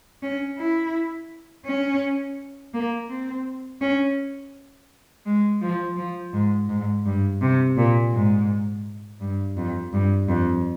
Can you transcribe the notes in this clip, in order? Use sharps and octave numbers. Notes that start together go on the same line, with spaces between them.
C#4
E4
C#4
A#3
C4
C#4
G#3
F3
F3
G#2
G#2
G2
C3
A#2
G#2
G2
F2
G2
F2